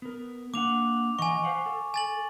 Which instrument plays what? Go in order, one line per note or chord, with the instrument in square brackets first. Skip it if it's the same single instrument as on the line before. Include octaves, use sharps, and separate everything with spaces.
[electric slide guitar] B3 A#4
[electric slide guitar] A#3 D4 F#5 [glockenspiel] D6 F7
[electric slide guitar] E3 D#5 F#5 [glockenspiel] G#5 C#6
[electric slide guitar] C5 F5 F#5
A4
[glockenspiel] G#5 A6 F#7